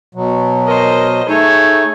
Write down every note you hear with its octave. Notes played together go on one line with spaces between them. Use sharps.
B2 F#3
A#4 C5 D#5
A3 D#4 G#4 A4 C#5